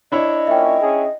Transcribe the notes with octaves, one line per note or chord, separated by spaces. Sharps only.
D4 E4 C#5 D#5
A#2 C#4 E5 G5
C#4 G#4